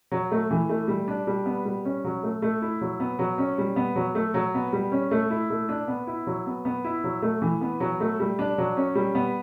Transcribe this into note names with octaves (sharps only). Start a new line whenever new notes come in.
F#3
A3
E3
A3
G3
D4
G3
B3
G3
C#4
F#3
A3
A3
E4
F#3
B3
F#3
C#4
G3
B3
F#3
A3
F#3
B3
G3
C#4
A3
E4
A3
D4
B3
E4
F#3
B3
B3
E4
F#3
A3
E3
B3
F#3
A3
G3
D4
F#3
C#4
G3
B3